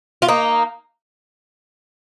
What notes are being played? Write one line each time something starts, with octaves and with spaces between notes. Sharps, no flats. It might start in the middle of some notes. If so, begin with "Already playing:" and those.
F4
A#3 D#4